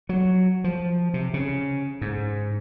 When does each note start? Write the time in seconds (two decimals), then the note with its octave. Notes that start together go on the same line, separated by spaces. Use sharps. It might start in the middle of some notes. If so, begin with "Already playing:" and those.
0.09 F#3
0.64 F3
1.14 C3
1.34 C#3
2.01 G#2